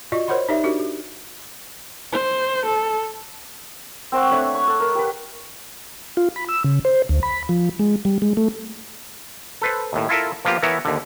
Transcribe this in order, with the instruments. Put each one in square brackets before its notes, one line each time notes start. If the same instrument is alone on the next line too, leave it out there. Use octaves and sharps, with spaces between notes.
[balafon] F4 F#4 D5 D#5
A#4 C5 C#5 F#5 B5 C6
D#4 G4 A#4 D5 E5
D4 F#4 G4 A#4
G4
[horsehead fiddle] C5
A4
[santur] C4 C5 F#5 C#6
A3 D4 B4 C#5
C#6
A4
A#4
G4 B4
[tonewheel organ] F4
B5
E6
C#3
C5
D2
B5
F3
G#3
G3
G#3
A3
[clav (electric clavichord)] A4 B4 C5
D#2 A2
E4 F4 A4 A#4 E5
F3 A#3 B3 F4 G4
E3 B3 A#4 C#5 E5
D#2 D3